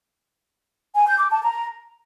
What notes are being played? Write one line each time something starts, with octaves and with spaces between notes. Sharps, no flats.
G#5
G6
D6
A5
A#5